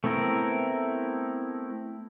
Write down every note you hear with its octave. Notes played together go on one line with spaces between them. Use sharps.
A3 B3 C4 E4 A#4